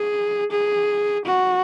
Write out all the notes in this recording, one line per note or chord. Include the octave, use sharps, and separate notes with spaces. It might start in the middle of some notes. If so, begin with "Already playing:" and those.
Already playing: G#4
G#4
F#4